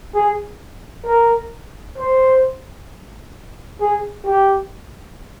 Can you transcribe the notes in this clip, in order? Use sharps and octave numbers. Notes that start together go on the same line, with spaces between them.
G#4
A#4
C5
G#4
G4